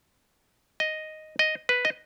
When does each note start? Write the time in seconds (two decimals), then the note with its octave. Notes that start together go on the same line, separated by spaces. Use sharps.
0.80 D#5
1.39 D#5
1.69 B4
1.85 D#5